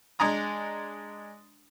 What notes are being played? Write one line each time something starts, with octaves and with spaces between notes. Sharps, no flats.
G#3 D4 G#5 A#5 D#6